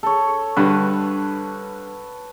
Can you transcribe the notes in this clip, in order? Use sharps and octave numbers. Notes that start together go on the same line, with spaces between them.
A4 C#5
G2 D3 B4